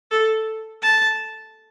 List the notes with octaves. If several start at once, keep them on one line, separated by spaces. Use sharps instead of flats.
A4
A5